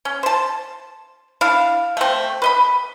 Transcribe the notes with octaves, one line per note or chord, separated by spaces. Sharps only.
C#4
C5 A5
D4 E4 F5
A3 C4
B4 D#5 B5